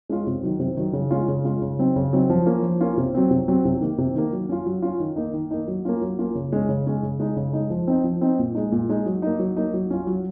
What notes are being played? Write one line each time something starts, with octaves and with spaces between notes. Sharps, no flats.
G#3 C#4 F4
C3
D#3 F#3
C3
D#3 F#3
C#3
G#3 C#4 F4
C#3
G#3 C#4 F4
C#3
F#3 C4 D#4
C#3
F#3 C4 D#4
F3
A#3 C#4 F4
F3
A#3 C#4 F4
C3
F#3 C4
C3
F#3 C4
C3
D#3 A#3
C3
D#3 A#3
F#3
C#4 F4
F#3
C#4 F4
D#3
A#3 D#4
D#3
A#3 D#4
F#3
A#3 C#4 F4
F#3
A#3 C#4 F4
C#3
G#3 C#4
C#3
G#3 C#4
C#3
G#3 D#4
C#3
G#3 D#4
F3
C4 D#4
F3
C4 D#4
A#2
G#3 D#4
A#2
G#3 D#4
F#3
A#3 D#4
F#3
A#3 D#4
F#3
C#4 F4
F#3